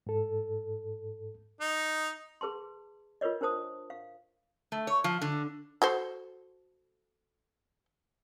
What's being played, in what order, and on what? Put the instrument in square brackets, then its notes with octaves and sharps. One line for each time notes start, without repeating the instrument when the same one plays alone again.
[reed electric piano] G#2 A4
[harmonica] D#4
[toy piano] G#4 B4 A5 C6
F4 A#4 B4 C#5 D#5
D4 A#4 C5 A5 D#6
F5
[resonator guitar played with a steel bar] A3
C#5
F3
D3
[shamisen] F#4 A4 C5